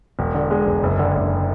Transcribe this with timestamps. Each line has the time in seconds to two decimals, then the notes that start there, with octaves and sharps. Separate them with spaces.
0.19 E1
0.35 D3
0.51 G#3
0.67 E1
0.83 F#1
0.99 D3
1.15 F#1